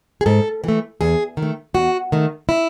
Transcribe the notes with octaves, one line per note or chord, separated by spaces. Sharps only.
G#4
G#2 A4
E3 A3
E2 G#4
D#3
A3
E2 F#4
D#3 A3
E4